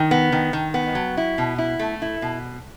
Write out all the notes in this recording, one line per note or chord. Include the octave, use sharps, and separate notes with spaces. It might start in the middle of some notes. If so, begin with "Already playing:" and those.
Already playing: D#3
B3
D#3
D#3
B3
F#3
E4
B2
E4
A3
E4
B2